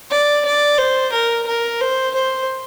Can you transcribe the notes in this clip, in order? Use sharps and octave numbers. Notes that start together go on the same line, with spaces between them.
D5
D5
C5
A#4
A#4
C5
C5